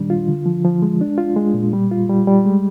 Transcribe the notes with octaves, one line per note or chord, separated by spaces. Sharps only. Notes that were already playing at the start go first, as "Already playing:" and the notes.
Already playing: A#2 D#3 G3 D4
F4
D3
F3
F3
G#3
D4
F4
G#3
A#2
G3
F4
G3
G3
G#3